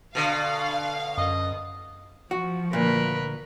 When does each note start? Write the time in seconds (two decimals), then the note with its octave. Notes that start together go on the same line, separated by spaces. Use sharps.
0.15 B2 D3 F5
1.18 F#2 D#5
2.31 F3 F#4
2.73 D2 A#2 A#4 B4